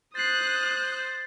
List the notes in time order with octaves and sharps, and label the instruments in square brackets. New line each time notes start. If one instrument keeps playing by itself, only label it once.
[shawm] C5 [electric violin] D#6 F#6 [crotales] A6 C7